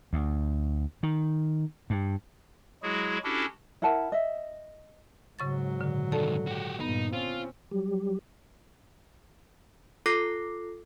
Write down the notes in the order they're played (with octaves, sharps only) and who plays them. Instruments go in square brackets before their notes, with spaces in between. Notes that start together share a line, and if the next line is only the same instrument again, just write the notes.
[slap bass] D2
D#3
G2
[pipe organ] F#3 G#3 E4 F#4 G#4
C#4 D4 E4 F#4 G4 A4
[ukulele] E4 A#4 F#5 A5
D#5 E5
[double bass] G#2 F#3 [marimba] C#3 C#6 A6
[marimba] A#2 D3
[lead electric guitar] C2 D#3 [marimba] A4 D5 A5
[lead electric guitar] F#4 G4
[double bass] G2 A#2 [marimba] B3 [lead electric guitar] D#4
[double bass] C4 C#4 [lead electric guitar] F4
[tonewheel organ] F#3 G3 G4
[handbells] F4 A4 D6 F#6 A#6 C7